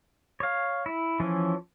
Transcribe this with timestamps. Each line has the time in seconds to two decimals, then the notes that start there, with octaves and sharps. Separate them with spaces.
0.40 C#5 F5
0.86 E4
1.20 E3 F3 C#4 E4